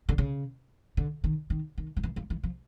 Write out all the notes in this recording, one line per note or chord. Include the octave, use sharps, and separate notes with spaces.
D3
C#3
D3
D#3
D#3
D#3
F3
E3
F3
E3
F3